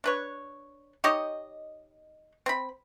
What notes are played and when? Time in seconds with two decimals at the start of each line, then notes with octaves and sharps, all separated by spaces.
0.04 D4 B4 C#5
1.04 D#4 G4 C#5 D#5
2.46 C4 B5